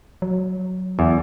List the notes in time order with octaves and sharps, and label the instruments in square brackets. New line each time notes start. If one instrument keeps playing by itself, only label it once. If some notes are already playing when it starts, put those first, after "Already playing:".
[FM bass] F#3
[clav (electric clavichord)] E2